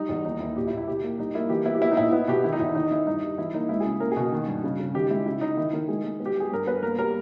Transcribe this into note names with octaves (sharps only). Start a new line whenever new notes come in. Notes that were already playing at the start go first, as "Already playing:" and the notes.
Already playing: G3 D#4
E2
D#2 D#4
D#2 E4
A#2 G4
E4
A#2
E4
B2 G4
A#3
G3 D#4
A#3 E4
E3 G4
B3 E4
G4
B3 E4
D#4
A#2 E4
B3 E4
B2 G4
D#3 E4
D#4
E2 E4
D#3 D#4
D#3 E4
G2 D#4
G3
E3 E4
A#3 D#4
C#2 E4
G#4
C#3
A#3 A#4
B2 G#4
D#3
G2
C#3
C#3
D#3 G4
G#3 E4
C#3 E4
C#3 D#4
D#3 E4
D#3 A#4
G#3 G#4
G#3
B3
G4
G3 G#4
G2 A#4
B3 B4
A#3 A#4
G3 A#4